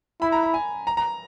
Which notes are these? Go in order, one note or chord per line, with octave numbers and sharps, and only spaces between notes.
E4 B5
A#5
B5
G#5
A#5
A#5